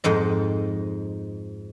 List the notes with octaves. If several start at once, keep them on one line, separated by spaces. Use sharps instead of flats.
F2 G#2 D#5